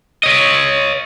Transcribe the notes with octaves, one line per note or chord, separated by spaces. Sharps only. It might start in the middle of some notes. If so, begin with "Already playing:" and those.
C#5 D#5